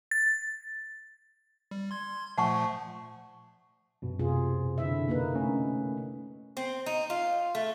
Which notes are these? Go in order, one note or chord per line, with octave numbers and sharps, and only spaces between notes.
A6
G3
C6 G#6
A#2 F3 A3 F#5 A5 C#6
F#2 B2
C3 F4 G#4
D3 E4 E5
A#3 D#4 B4
A3 C#4
C4
D#4
F4
A3